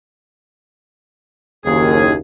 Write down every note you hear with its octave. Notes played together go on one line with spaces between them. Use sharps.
F#1 D#2 G#4